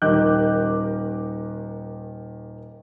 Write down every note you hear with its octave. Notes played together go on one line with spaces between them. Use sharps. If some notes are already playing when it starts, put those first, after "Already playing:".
D#1 D#3 D#5 D6 F#6 G6